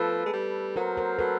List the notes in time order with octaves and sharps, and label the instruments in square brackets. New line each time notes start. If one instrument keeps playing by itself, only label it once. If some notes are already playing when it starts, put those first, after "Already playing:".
Already playing: [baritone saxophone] F3 [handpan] A4 B4
[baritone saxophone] G#3
G3
[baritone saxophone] F#3 [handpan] A#4 C5
[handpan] A#4 C5
[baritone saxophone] F#3 [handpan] A4 B4